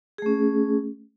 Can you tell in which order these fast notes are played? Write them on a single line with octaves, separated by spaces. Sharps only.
G#4 A3 C#4